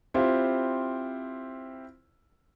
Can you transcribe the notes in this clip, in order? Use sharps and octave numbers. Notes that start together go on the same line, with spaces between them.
C4 E4 F4 G4 C5